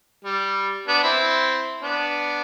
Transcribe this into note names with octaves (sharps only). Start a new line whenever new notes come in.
G3
B3 D4
C4 E4
B3 D4